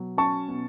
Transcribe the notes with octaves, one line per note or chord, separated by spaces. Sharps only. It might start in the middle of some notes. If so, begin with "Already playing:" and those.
Already playing: B2 F#3
C#4 A5 C#6
B2